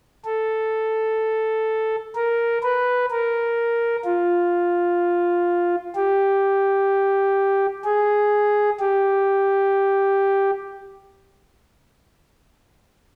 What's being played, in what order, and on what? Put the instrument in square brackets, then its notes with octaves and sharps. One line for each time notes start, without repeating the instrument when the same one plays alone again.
[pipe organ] A4
A#4
B4
A#4
F4
G4
G#4
G4